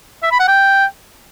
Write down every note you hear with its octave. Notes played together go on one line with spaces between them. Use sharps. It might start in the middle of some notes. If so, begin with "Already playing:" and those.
E5
B5
F#5
G5